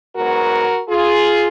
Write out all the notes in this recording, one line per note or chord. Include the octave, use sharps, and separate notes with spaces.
G#2 F#3 B3 F#4 A#4
F4 G#4